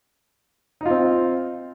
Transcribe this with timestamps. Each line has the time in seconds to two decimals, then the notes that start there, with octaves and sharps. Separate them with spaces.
0.81 D#4
0.86 F4
0.90 C4